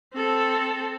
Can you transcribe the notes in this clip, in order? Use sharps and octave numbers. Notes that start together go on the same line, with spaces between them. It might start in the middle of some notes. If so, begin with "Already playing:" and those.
C4 A4